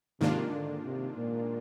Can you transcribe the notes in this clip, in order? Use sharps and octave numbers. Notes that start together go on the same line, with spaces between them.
G#2 C3 D#3 A#3 D4 F4
D3
C3
A#2